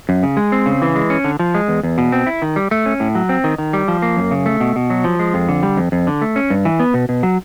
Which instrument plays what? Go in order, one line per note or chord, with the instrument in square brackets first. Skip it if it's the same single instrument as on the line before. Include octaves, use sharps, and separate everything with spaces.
[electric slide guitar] F#2
C#3
G#3
C4
C#3
E3
G#3
C#4
D3
F3
G#3
E2
E2
B2
C4
E4
D#3
G3
A3
C#4
A2
F#3
C4
D#3
D#3
G3
F3
A#3
F#2
C#3
A3
B2
B2
F#3
F3
G#3
F2
D3
G3
F2
F2
D3
A3
C#4
G2
E3
B3
B2
B2
F#3